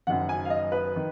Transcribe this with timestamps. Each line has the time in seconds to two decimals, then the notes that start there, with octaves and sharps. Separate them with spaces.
0.07 F#1 F#2 D#3 F#5
0.29 G#5
0.45 F5
0.50 D#5
0.72 B4
0.96 D#3